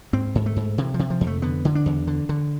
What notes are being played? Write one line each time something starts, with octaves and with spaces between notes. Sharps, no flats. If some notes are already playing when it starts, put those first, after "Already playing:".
G#2 C4
G#2
A3
G#2
C3 E3
F3
C3
F3
F2
A3
D3 B3
D3
D4
E2
D3
D3